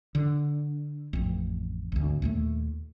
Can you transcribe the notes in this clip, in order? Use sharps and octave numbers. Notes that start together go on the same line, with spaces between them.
D3
A1 F2
G#1 D2
D#2 A#2 A3